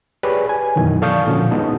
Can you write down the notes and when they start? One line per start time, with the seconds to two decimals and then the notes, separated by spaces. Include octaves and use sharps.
0.23 G4 G#4 B4 C#5 D5
0.49 G#5
0.76 F#2 B2 D#3 E3 F#3
1.02 A4 D5 F5 C#6 D#6 G6
1.27 A#2 D3 F3 C#4 F#4
1.51 G#3 B3 D#4 F#4 A4